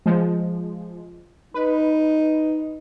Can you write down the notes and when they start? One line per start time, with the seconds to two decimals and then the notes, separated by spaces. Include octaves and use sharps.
0.06 F3 G#3
1.54 D#4 B4